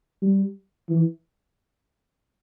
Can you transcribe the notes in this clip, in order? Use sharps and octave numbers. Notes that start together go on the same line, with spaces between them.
G3
E3